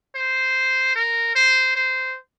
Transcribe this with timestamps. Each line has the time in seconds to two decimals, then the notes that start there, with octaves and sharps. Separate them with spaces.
0.16 C5
0.96 A#4
1.35 C5
1.76 C5